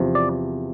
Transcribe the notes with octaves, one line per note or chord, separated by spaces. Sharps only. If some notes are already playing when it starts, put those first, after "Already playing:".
Already playing: E2 C3 F3
D5